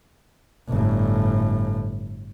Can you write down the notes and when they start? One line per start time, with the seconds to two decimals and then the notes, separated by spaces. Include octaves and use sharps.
0.69 G1 A2